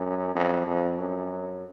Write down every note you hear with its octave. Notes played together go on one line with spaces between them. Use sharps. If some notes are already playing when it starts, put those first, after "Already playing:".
Already playing: F#2
F2
F2
F#2